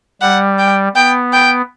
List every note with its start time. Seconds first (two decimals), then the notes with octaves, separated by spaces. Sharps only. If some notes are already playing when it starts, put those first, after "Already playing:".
0.21 G3 F#5
0.59 G5
0.95 B3 G5
1.33 G5